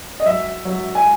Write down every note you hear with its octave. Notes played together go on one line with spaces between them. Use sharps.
D#5
F#3 E5
F#3
G#5